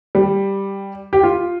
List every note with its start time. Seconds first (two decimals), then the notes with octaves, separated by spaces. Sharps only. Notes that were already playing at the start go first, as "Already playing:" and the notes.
0.15 G3
1.13 G4
1.23 F4